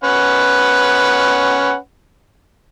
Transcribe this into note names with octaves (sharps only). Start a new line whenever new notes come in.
C#4 B4 F#5